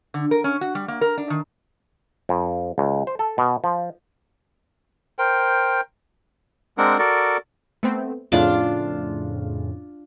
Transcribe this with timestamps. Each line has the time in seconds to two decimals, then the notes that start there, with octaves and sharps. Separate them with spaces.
0.14 D3
0.31 A#4
0.44 C#4
0.61 F#4
0.75 G3
0.88 A#3
1.01 A#4
1.18 D4
1.30 D#3
2.29 F2
2.78 C#2
3.07 C5
3.19 A4
3.38 B2
3.64 F3
5.19 A#4 C5 G5
6.78 G#3 C4 D4 A#4 F#5
6.99 F#4 A4 A#4 D5
7.83 A3 B3 C4
8.32 F2 A2 C#3 D4 F4 D6